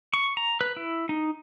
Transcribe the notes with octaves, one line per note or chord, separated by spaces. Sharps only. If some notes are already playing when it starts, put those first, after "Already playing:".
C#6
A#5
B4
E4
D#4